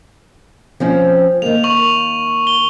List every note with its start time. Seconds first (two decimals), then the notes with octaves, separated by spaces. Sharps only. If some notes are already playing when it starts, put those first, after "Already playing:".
0.80 F3 C4 C#4
1.42 D#3 A#3 F7
1.64 C#6 F7 F#7
2.47 G7